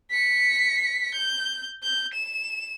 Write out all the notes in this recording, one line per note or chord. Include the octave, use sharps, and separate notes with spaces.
B6 C#7
G6
G6
E7